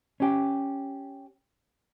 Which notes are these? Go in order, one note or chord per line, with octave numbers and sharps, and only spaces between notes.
C#4 G4